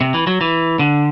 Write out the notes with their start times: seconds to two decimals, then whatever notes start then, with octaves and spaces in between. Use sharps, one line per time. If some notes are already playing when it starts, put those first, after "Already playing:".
0.01 C3
0.14 E3
0.27 F#3
0.41 E3
0.79 D3